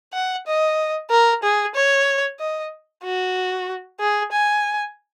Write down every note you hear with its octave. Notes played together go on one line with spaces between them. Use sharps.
F#5
D#5
A#4
G#4
C#5
D#5
F#4
G#4
G#5